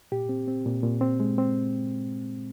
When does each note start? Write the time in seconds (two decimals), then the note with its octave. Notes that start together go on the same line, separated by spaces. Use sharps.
0.12 A#2 G4
0.29 C4
0.47 C4
0.66 A#2
0.83 A#2
1.01 C4
1.20 G#3
1.38 C4